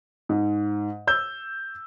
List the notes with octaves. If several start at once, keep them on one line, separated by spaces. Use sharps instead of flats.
G#2
E6 G6